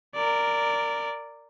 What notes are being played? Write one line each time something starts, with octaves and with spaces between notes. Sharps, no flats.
A#4 D5